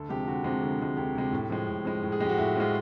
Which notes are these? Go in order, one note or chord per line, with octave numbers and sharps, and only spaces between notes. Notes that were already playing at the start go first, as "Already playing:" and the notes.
Already playing: D2 A4
C3 F3 G#3 G4
D2 F#4
C3 F3 G#3
D2
C3 F3 G#3
D2 G4
C3 F3 G#3
A2
F3 G#3
A2
F3 G#3
A2
G#4
F3 G#3 F#4 G4
A2 E4
F3 G#3 F4